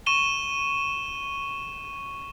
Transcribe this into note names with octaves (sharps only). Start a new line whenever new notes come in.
C#6 D#7 E7 G7